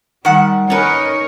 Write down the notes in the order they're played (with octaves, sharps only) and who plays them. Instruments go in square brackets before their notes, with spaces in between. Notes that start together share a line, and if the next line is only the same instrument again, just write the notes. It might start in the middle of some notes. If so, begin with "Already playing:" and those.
[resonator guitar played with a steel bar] D#3 F#5 [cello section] G3
[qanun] C#4 B4 [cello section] D#4 A#4 C#5